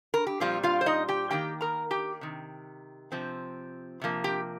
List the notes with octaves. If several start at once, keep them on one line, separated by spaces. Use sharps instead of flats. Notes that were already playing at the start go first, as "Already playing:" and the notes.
A#4
G4
A#2 F3 G3 C4 F4
F4 F5
C5
D#4 D#5
G4 G5
D#3 A#3 G4 G5
A#4 A#5
G4 G5
C3 D#3
C3 F3 C4
C3 F3 A#3
G4 G5